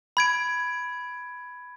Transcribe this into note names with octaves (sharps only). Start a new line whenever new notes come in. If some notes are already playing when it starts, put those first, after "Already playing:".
B5 G#6 D7